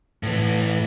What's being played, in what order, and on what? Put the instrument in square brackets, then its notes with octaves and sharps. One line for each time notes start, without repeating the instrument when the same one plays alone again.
[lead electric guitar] A2 E3